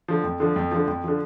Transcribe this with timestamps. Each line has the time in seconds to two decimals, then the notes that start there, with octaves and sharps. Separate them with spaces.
0.08 D3 F3
0.24 F2
0.40 D3 F3
0.56 F2
0.71 D3 F3
0.87 F2
1.04 D3 F3